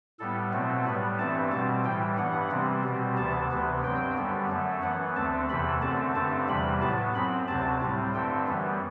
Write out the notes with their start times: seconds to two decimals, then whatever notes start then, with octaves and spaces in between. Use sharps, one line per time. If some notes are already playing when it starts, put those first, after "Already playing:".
0.19 A2 G3 B3 A4
0.53 B2 F#3 A3 C4
0.85 A2 G3 B3 B4
1.19 G2 E3 A3 C4 A5
1.51 B2 G3 C4 A5
1.85 A2 E3 G3 G5
2.18 G2 E3 B3 F#5
2.51 C3 E3 G3 C4
2.84 B2 G3 C4
3.17 D2 C3 E3 B3 A5
3.50 D2 C3 E3 B3
3.84 G2 F#3 C4 G5
4.16 F#2 D3 G3 B3
4.50 F#2 F#3 A3
4.82 F#2 E3 B3 F#5
5.16 D2 D3 A3 C4 A5
5.49 E2 C3 E3 A3 B5
5.82 F#2 D3 A3 C4 A5
6.15 G2 D3 A3 C4 A5
6.48 E2 C3 E3 G3 B5
6.81 A2 F#3 B3 A5
7.14 F#2 F#3 C4 B5
7.48 D2 C3 F#3 C4 A5
7.81 A2 G3 C4
8.14 G2 D3 A3 C4 G5
8.47 F#2 E3 G3 B3